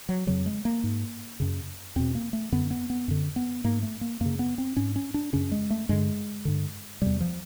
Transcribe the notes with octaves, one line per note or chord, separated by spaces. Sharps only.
F#3
F2 C#3 F#3
G#3
A#3
G#2
F#2 C#3
E2 B2 C4
A#3
A3
F#2 D3 B3
B3
B3
F#2 D3
B3
G#2 A#3
A3
A#3
F#2 C#3 A#3
B3
C4
G#2 C#4
C#4
D4
F#2 C#3 C#4
G#3
A3
G2 D3 G#3
G2 D3
E2 C3 G3
F3